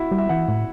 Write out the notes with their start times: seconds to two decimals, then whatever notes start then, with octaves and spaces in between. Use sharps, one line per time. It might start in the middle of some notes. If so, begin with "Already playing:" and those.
Already playing: E4 F#4
0.11 G3
0.18 E5
0.29 E3 F#5
0.48 A2